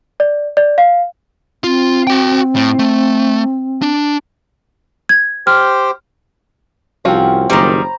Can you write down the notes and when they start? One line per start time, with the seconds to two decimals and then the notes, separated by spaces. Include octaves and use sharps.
0.20 D5
0.57 D5
0.78 F5
1.64 C4 F4
2.07 F#4 G5
2.55 A2
2.79 A3
3.82 D4
5.09 G#6
5.47 G4 C5 G5 F6
7.05 C2 F3 C4 C#4 F4 F#4
7.50 F#1 D#3 G3 C5 A#5 B5